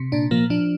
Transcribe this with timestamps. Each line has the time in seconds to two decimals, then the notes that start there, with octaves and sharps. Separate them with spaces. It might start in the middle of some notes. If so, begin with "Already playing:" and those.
Already playing: C3
0.12 A#2 D4
0.31 F3 A#3
0.50 F3 D4